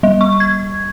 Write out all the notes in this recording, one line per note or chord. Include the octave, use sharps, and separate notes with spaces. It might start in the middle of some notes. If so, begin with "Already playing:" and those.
G3
C#6
G#6